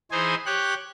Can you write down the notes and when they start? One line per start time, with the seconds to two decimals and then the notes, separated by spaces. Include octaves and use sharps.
0.11 E3 D#4 G#4 C5 G#5
0.46 G4 C#5 F#6